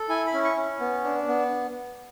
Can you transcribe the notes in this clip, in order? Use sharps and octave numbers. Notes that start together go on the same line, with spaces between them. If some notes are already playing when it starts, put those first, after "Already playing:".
Already playing: A4
E4 G#5
B5
C#4
C#6
C#4
B3
D4
B3